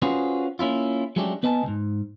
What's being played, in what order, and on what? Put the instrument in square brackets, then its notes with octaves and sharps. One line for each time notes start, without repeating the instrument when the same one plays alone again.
[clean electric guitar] C#4 F4 F#4 G#4 B4 C5
A#3 C#4 E4 F4
F#3 G#3 A3 C#4 D4 G4
B3 B4 D#5 G#5 A5
C#2 G#2